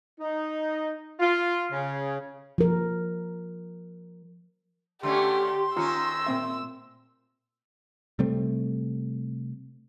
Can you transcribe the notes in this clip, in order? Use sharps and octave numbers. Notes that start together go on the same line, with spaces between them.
D#4
F4
C#3
F3 A#4
D3 A3 C#4 G4 C6
D#3 C#4 F4 A#5 E6
A#2 C4 E5
C3 G3 A3 C4